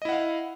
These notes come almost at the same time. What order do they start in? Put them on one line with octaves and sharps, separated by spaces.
D#5 E4 F#5 F5